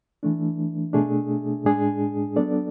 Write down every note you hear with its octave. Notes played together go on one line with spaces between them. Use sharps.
E3 A3 D4
B2 A3 D4 G#4
A2 G#3 D4 G#4
F#3 B3 D4 A4 D5